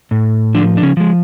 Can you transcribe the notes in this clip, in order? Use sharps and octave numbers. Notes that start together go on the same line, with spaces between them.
A2
D3 F3 D4
D4
C#3 C#4
F3 G#3